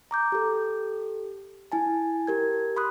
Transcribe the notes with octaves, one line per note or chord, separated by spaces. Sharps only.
A#5 D6 G6
G4 A4
E4 G#5 A5
G4 A#4 G#6
B5 C6 D#6 F#6